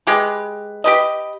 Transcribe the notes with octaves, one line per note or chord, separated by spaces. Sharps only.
G#3 G4 B4
G4 B4 D#5